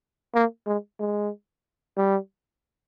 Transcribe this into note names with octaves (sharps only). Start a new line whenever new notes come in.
A#3
G#3
G#3
G3